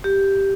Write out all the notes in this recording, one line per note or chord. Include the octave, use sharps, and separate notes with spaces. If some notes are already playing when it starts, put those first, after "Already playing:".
G4